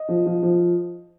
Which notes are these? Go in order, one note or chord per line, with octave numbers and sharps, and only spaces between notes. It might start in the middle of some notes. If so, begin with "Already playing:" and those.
Already playing: D#5
F3
F3
F3